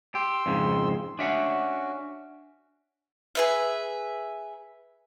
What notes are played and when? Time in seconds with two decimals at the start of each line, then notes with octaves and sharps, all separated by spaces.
0.15 G4 C6 E6
0.46 F2 G#2 C#3
1.19 C#4 D4 F#4 E5 F#5
3.35 G#4 B4 E5